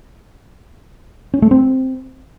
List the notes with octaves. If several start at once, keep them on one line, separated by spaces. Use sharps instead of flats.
C#4
A3
C4